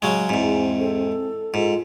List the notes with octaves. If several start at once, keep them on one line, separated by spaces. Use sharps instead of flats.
C#3 F#3 G#3 G#5
E2 G#2 C4
A4
G#2 F4